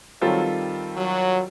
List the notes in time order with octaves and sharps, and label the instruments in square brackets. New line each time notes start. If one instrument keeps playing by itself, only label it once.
[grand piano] D#3 G3 C4 F4 A4 [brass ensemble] F#3
[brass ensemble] F#3